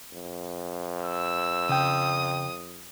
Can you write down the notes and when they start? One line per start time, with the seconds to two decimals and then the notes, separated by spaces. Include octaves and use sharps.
0.12 F2
1.01 E6
1.69 C#3 G5 D#6